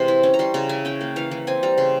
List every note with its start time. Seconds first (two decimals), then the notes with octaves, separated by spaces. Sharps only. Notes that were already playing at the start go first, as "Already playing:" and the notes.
Already playing: C3 E3 G#3 C6
0.08 E4
0.23 C#4
0.34 A#5
0.39 G3 C6
0.54 C#3 A#5
0.69 E4 G#5
0.85 C#4 G5
1.01 A#3
1.16 E3 F5
1.31 E3
1.47 C4 G#5
1.63 G3 A#5
1.78 C#3 C6